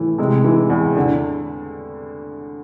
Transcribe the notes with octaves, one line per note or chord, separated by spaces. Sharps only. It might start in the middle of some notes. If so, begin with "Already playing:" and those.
Already playing: A2 E3
C3 G#3
E3
E2
D3